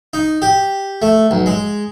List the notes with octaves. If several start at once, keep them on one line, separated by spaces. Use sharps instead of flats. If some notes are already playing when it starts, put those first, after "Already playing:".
D#4
G4
A3
B1
G#3